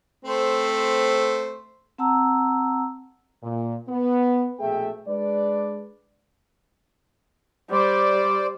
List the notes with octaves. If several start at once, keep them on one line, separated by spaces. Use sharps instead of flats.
A3 C4 C5
C4 F#5 A5 A#5 E6
A#2
B3
A#1 B2 A3 G#4 E5 G5
G#3 D4 B4 D5
G3 C5 D5